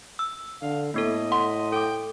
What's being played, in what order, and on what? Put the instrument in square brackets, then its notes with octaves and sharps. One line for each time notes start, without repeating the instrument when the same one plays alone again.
[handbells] E6
[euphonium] D3 [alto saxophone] F5
[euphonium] A2 [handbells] A#3 B3 A4 [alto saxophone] D#5
[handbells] F#5 [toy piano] C6
[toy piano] A4 D6 [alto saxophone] G5